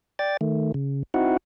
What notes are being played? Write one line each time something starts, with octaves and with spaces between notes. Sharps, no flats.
D5 G5 A6
D#3 A3
C#3
C4 D#4 E4 F#4 F#5